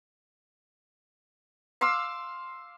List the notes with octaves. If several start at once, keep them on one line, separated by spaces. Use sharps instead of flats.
F5 C6 D6 E6